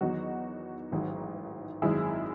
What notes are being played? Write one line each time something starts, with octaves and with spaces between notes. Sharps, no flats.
E2 D#3 F#3 D#4 F#4
A1 G#2 D#3 F#3
G#1 F#2 D#3 G#3 E4 G#4